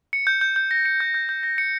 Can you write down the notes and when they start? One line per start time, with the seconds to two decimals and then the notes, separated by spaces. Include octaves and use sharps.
0.13 C#7
0.27 G6
0.41 G6
0.56 G6
0.71 A#6
0.85 C#7
1.00 G6
1.14 G6
1.29 G6
1.43 A#6
1.58 C#7